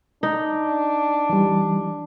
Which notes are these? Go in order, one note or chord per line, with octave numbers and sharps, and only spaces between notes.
D4 D#4
E3 G3